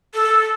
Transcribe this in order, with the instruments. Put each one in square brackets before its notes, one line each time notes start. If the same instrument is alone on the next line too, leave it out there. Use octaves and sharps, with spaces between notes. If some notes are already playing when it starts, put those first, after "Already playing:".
[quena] A4